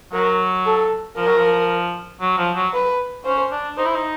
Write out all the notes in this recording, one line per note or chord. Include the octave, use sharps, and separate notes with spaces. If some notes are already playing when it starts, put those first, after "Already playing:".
F#3 A#4
A4
F3 A#4
F#3
F3
F#3
F3
F#3
B4
C#4 C5
D4
D#4 C5
E4
D#4